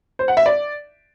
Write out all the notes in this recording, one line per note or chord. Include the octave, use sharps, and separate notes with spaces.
C5
F#5
E5
D5